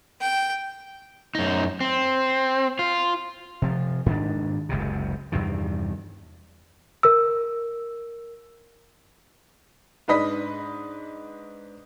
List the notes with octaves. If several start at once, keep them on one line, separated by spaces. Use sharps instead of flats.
G5
F#2 D#4
C4
F4
C3 F3
G#2 D#3 D4
F#1 C#2 F#2 C3
E2 G2 C3 D#3
A#4 E6
G#2 D4 B4 D#5 B6